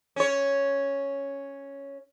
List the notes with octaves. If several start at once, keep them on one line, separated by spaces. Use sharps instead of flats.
C#4 C#5